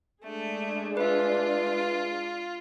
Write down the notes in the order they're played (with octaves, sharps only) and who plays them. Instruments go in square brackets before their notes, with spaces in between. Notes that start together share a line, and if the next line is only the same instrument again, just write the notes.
[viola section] G#3 D4 G#4 [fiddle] A3
[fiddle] F4 [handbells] B4 E5